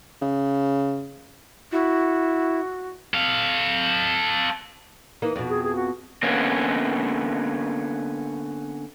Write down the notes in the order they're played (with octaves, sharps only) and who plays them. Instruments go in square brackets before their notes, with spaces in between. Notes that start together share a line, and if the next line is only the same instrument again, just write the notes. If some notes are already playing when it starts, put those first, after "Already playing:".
[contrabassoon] C#3
[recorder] E4 [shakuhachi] F#4
[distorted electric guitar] A4 F5
[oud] E3 A#3 D#4
F2 B2
[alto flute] G#4
G#4
F#4
[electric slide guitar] D3 A#3 B3 C#4